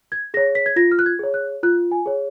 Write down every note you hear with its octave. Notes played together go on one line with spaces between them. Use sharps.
G#6
G#4 C#5 A#6
B6
G#6
F4 A#6
F6
F#6
G#6
G#4 C#5
F#6
F4 F#6
G#5
G#4 C#5